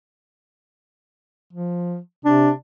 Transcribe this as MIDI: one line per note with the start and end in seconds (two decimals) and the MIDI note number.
1.53 1.98 53
2.25 2.52 48
2.25 2.50 62